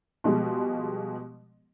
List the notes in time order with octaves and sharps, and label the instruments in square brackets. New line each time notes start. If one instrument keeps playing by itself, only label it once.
[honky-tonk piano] B2 F3 G3 G#3